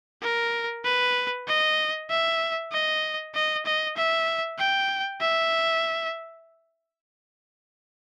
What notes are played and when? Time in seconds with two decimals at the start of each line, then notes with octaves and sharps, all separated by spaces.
0.22 A#4
0.85 B4
1.47 D#5
2.10 E5
2.72 D#5
3.35 D#5
3.66 D#5
3.96 E5
4.59 G5
5.21 E5